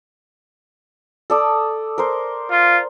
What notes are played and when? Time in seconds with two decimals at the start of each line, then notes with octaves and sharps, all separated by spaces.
1.30 A4 D5 D#6
1.98 A#4 C5
2.51 F4